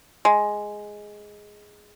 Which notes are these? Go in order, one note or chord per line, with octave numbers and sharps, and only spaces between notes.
G#3